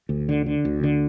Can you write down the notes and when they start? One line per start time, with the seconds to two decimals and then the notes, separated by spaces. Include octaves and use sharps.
0.09 D2
0.29 D3
0.46 D3
0.65 D2
0.83 D3